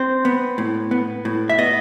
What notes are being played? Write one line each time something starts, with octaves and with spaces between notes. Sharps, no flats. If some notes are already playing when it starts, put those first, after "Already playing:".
Already playing: C4 C5
B3
A2
B3
A2
E5
B3 D#5